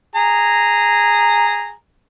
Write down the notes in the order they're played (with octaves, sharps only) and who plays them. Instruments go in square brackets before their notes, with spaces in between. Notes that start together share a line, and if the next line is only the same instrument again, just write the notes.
[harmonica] G#4 A#5